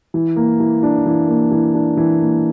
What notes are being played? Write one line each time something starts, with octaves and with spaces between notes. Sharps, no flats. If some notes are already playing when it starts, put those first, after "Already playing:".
E3
A#3
E3
D4
E3
A#3
E3
D4
E3
A#3